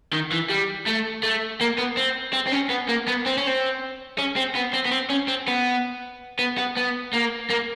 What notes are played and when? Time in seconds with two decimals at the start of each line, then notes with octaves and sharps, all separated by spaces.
0.13 D#3
0.32 E3
0.49 G3
0.86 A3
1.23 A3
1.61 A#3
1.78 B3
1.97 C4
2.33 C4
2.47 C4
2.52 C#4
2.70 B3
2.89 A#3
3.08 B3
3.26 C4
3.37 C#4
3.47 C4
4.19 C#4
4.36 C4
4.55 B3
4.73 C4
4.85 B3
4.91 C4
5.10 C#4
5.28 C4
5.48 B3
6.39 B3
6.58 B3
6.77 B3
7.13 A#3
7.50 A#3